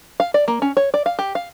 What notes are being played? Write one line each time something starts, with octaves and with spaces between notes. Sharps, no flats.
F5
D5
A#3
C#4
C#5
D5
F5
G4
F5